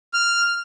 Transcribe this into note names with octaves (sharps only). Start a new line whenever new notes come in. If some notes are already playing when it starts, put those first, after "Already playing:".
F6